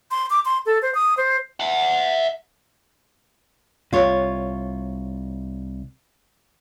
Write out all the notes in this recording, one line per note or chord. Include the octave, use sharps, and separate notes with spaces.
C6
D6
C6
A4
C5
D#6
C5
E5 F#5
C2 F4 C#5